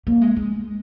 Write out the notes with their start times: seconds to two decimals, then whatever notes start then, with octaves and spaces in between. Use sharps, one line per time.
0.07 A#3
0.21 G#3
0.37 G#3